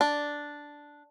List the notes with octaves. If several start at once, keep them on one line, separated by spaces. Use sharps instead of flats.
D4